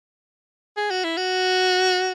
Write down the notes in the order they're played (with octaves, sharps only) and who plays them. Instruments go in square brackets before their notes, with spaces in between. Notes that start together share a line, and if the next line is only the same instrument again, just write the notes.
[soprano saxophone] G#4
F#4
E4
F#4